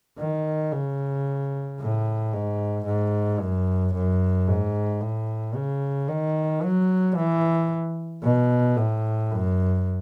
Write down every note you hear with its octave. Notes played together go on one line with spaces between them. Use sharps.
D#3
C#3
A2
G#2
G#2
F#2
F#2
G#2
A2
C#3
D#3
F#3
E3
B2
A2
F#2